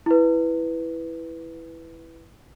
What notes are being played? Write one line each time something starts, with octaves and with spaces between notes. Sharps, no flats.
E4 B4